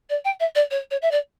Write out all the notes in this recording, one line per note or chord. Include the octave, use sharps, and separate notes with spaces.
D5
G5
E5
D5
C#5
C#5
E5
D5